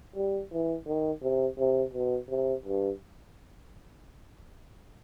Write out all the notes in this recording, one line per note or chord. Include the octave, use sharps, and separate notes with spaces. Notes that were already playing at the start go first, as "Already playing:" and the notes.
G3
E3
D#3
C3
C3
B2
C3
G2